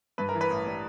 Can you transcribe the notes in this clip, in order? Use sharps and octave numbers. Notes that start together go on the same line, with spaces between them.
G2 B4
A#4
E3
B4
A1
G3